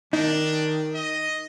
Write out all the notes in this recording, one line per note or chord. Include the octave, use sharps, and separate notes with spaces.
D#3 D4 D#4
D#5